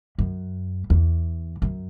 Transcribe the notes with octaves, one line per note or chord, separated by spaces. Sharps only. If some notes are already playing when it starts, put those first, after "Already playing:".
F#2
E2
F#2